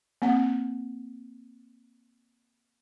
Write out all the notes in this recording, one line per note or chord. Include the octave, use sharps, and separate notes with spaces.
A#3 C4 F#5